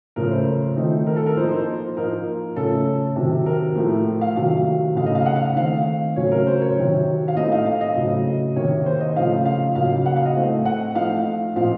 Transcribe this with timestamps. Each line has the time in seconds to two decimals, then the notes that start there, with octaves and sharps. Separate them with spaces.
0.16 C#3 F3 A3 C#4 A#4
0.32 C5
0.76 D#3 A3 C4 D#4
1.07 A#4
1.16 A4
1.26 A#4
1.36 F3 A#3 D#4 C5
1.51 C5
1.97 F3 A#3 D#4 A#4
2.56 C#3 A3 C#4 A4
3.16 C3 D#3 F#3 C4
3.46 A#4
3.76 A2 F3 A3
4.21 F5
4.36 C3 D#3 F#3 A3 F5
4.96 C#3 A3 D#4 F5
5.06 D#5
5.15 F5
5.26 F#5
5.36 F5
5.56 D#3 A3 C4 F5
6.16 C#3 F#3 A3 C#4 C#5
6.32 A#4
6.47 C5
6.62 C#5
6.76 C3 D#3 F#3
7.28 F5
7.36 A2 A3 C4 D#4 D#5
7.52 F5
7.66 F5
7.81 D#5
7.96 C#3 F#3 A3
8.56 C3 D#3 A#3 C#5
8.86 C5
9.01 D#5
9.16 C#3 F3 A3 D#4 F5
9.45 F5
9.75 C#3 F#3 A#3 D#4 F5
10.06 F#5
10.16 F5
10.26 D#5
10.37 A2 A3 C4
10.66 F#5
10.95 F3 A3 D#4 F5
11.55 A#2 F3 C4 D#4 F5